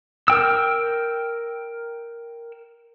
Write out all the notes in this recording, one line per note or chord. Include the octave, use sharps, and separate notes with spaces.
A#4 G5 E6